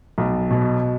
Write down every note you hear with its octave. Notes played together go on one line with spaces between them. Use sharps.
B1
B2